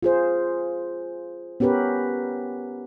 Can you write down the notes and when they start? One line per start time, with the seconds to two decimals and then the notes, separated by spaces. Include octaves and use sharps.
0.02 F4 G#4 C5
1.60 B3 C#4 G4 A#4 B4